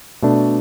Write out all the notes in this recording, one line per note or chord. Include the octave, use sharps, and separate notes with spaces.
B2 A3 D4